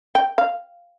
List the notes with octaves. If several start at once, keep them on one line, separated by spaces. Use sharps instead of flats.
G5
F5